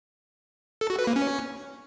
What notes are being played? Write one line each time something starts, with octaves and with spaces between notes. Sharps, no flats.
A4
F#4
B4
A#3
C#4